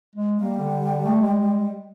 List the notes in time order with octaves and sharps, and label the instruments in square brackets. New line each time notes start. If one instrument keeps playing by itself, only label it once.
[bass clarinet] G#3
[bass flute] G3 [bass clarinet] A#3
[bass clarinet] D3
A3
G#3